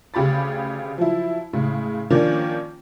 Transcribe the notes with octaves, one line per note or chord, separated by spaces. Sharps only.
D2 C#3 G4 B5 A6
F3 F#3 E4
A2 C#3 G#3
D#3 F3 A#3 C#4 D4 F4